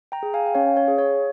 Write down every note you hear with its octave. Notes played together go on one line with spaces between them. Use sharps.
G5 A#5
G#4
F5 G#5
G5
C#4 C#5 F5
C#5
G#4
C#5